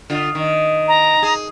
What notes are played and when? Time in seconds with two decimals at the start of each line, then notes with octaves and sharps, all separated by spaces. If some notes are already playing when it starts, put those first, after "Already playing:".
0.10 D3 F4
0.35 D#3
0.88 A#5
1.22 G#4